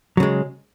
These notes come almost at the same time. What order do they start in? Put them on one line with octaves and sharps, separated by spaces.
F#3 C#3 G#3